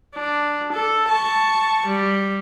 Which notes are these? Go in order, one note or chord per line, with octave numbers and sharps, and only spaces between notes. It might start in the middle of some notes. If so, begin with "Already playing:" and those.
D4
A4
A5 C#6
G3